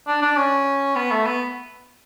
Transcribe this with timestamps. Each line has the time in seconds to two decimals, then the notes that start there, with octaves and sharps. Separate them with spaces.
0.07 D4
0.22 D4
0.36 C#4
0.95 B3
1.11 A3
1.26 B3